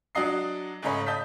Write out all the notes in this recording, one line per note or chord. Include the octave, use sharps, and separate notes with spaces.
F#3 D4 F#4 D#5 C7
G#2 C#3 A3 D#4 C#5 B5
D#5 A5 G6 B6